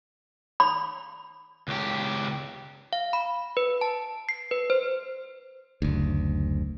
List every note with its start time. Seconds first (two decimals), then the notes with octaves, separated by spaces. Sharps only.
0.60 B5
1.68 C#2 G4
2.93 F5
3.13 B5
3.57 B4
3.81 A5
4.29 C7
4.51 B4
4.70 C5
5.82 F#1 D2